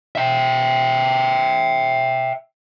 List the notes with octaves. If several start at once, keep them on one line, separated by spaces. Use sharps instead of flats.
E5 G5